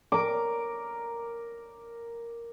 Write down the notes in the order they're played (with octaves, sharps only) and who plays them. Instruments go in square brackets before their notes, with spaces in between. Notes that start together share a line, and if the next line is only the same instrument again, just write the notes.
[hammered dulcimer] A#4 D6